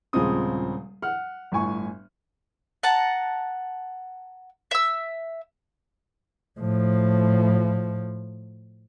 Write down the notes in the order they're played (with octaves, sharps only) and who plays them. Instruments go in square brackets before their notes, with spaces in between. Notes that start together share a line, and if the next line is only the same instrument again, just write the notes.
[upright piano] D#1 C#3 F3 G#3 C4 D#6
F#5 F6
G1 A2 G#5 C#6
[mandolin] F#5 A5 A#5
E5 E6
[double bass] A2 F3